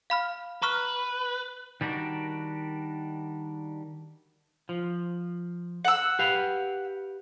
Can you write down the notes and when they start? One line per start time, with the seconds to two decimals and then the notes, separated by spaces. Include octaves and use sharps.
0.10 F5 B5 F6
0.62 B4 A#5 C#6 F6
1.81 D#3 G3 D4 F#4 A#4
4.69 F3
5.85 F#5 E6
6.19 G4 B4 F5